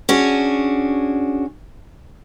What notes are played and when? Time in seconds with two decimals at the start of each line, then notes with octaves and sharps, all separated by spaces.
0.09 C#4 D4 F#4 G#4